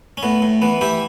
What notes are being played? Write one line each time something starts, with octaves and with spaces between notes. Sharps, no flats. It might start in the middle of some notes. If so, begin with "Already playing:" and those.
C#4
A2 B3
A2
E3 B3
E3 E4 G4